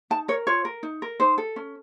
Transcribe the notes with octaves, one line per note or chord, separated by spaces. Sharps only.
D#4 A5
A#4 C#5
F4 C#5
A#4
D#4
A#4
D#4 C5
A4
C#4